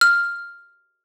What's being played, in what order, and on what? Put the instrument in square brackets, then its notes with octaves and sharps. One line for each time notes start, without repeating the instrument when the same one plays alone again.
[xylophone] F6